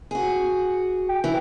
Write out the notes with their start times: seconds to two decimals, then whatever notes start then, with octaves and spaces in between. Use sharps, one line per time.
0.11 F#4 G#4
1.09 G5
1.24 E3